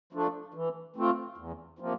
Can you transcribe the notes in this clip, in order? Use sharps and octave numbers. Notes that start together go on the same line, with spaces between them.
F3 A3 D4
E3
A3 C4 F4
E2
C3 F3 A#3